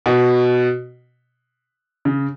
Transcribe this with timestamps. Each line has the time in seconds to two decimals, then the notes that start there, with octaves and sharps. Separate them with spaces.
0.06 B2
2.05 C#3